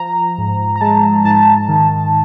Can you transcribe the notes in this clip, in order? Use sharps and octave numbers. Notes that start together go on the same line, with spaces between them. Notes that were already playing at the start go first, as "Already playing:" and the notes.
Already playing: F3 A#5
G#2
A#5
G#3 A5
G#2 A5
D#3